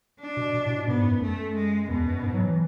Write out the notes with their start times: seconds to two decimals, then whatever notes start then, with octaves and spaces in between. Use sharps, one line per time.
0.20 D4
0.37 B2
0.54 B2
0.65 A2
0.71 B2
0.87 G#2 B3
1.04 F#2
1.22 F#2 A3
1.55 G#3
1.89 E2 B2
2.06 F#2
2.23 G#2
2.34 F#3
2.45 E3